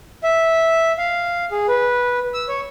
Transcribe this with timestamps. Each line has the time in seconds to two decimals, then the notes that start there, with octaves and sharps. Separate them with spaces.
0.23 E5
0.98 F5
1.51 G#4
1.68 B4
2.34 E6
2.48 C#5